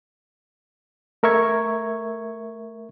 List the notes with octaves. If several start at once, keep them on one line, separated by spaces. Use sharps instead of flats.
A3 A#4 E5 C#6 G#6